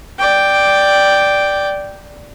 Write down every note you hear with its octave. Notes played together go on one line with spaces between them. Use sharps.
D5 G5